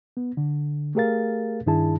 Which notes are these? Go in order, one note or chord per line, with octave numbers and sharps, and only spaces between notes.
B3
D3
A3 G4 G#4 A#4 F5 A6
G2 D#3 D4 E4 G#4 A5